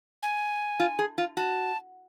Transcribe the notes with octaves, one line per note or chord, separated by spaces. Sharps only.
G#5
F4
G#4
F4
F#4 A5